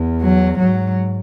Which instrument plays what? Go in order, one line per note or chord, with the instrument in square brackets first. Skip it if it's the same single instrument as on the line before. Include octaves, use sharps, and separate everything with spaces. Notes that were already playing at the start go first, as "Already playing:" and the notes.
Already playing: [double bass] E2
[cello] F#3
[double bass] G#2 [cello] F#3